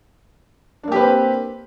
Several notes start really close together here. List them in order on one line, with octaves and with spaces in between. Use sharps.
D4 A#3 G4 B4 C4